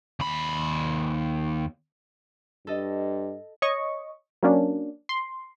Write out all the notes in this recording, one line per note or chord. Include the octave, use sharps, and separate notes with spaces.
D#2 B5
G2 A4 D#5
C#5 D#5 C#6
F#3 A#3 C#4 D4
C6